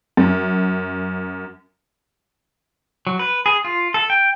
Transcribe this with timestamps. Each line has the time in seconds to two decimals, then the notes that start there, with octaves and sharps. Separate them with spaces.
0.17 F#2
3.07 F#3
3.19 B4
3.46 G#4
3.65 F4
3.94 A4
4.10 G5